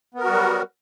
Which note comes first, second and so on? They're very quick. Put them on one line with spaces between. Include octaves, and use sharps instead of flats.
B3 A#4 F#4 G3 F#3